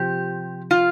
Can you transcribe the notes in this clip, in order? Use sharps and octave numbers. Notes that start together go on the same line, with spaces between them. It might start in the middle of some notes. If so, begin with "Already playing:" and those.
Already playing: C3 F3 G4
F4